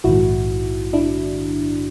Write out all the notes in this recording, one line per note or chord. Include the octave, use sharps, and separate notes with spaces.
A#1 G#2 D#3 E4 F#4
D4 E4